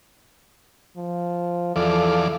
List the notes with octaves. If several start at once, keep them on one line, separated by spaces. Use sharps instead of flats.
F3
E2 F3 A4 D5